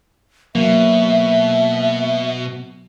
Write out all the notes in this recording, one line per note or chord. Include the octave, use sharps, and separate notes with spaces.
B2 F#3 A#3 E5